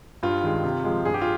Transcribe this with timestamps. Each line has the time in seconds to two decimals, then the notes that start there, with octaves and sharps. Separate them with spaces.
0.23 G2 F4
0.43 D#3 G#3
0.64 C3
0.84 F3 G#3
1.05 G2 G#4
1.14 G4
1.22 F4